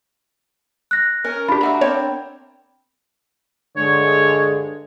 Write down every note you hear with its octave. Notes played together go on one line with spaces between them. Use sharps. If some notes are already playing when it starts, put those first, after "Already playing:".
F#6 A#6
C#4 A#4
D4 F4 G4 B5
A3 F#4 E5 A#5
C4 A#4 C#5
G2 D3 G#3 C#5